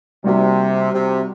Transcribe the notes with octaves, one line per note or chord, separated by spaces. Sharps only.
C3 G3 A#3 D#4 F#4
C3